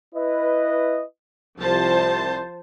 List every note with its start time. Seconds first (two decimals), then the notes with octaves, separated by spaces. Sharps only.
0.15 E4 B4 D#5
1.60 C2 F3 C5 A5